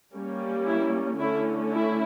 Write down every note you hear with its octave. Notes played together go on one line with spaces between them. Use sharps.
G3 A#3 C#4
E4
D3 A3 C#4 E4
E4